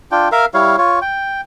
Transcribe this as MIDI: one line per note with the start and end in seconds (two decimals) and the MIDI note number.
0.12 0.28 62
0.12 0.28 65
0.12 0.28 79
0.32 0.45 70
0.32 0.45 76
0.32 0.45 77
0.54 0.76 55
0.54 0.76 64
0.54 0.76 73
0.54 0.76 77
0.78 0.99 65
0.78 0.99 73
1.02 1.41 79